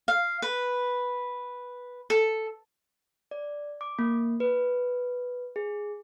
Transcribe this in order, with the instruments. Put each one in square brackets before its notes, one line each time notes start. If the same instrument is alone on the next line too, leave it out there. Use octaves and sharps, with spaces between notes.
[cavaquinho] F5
B4
A4
[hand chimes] D5
D6
A#3
B4
G#4